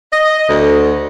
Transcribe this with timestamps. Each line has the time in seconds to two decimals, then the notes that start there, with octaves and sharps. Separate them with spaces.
0.12 D#5
0.49 D2